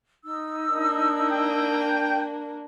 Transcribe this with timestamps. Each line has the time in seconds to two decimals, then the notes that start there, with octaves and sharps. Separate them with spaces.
0.23 D#4 E6
0.73 A#3 D4
1.31 G5